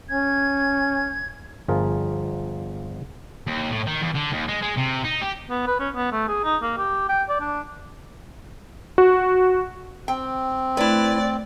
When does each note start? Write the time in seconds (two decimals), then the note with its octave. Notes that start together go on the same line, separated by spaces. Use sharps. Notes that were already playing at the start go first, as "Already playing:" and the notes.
0.09 C#4 G#6
1.68 G1 F3 F4 G#4 A#4
3.47 D#2
3.71 A2
3.87 D#3
4.01 E2
4.15 D3
4.32 D#2
4.48 G#3
4.62 G#3
4.78 C3
5.05 D#4
5.21 G4
5.50 B3
5.67 B4
5.80 C#4
5.95 B3
6.12 A3
6.28 G#4
6.44 D#4
6.62 A#3
6.78 G4
7.09 G5
7.29 D5
7.41 D4
8.98 F#4
10.08 C4 G5
10.77 A3 E4 B4 D5